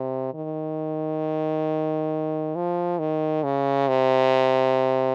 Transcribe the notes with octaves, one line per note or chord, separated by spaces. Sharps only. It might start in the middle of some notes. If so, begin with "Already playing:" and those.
Already playing: C3
D#3
F3
D#3
C#3
C3